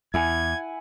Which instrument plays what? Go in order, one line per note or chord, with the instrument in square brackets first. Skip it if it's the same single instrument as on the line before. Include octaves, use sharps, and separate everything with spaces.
[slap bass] E2 [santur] E4 F#5 G#5 [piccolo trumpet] G#6